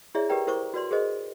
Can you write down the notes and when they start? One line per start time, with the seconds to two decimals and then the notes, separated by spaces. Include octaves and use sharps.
0.15 E4 G#4 C#5 D5 E5
0.29 G4 A#4 B4 D5 G5 A#5
0.47 E4 A#4 C5 C#6 D6
0.74 F#4 B4 D5 C6
0.91 G#4 A#4 C5 D#5